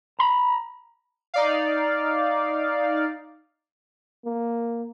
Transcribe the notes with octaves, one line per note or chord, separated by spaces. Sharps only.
A#5 B5
D#4 D5 F5
A#3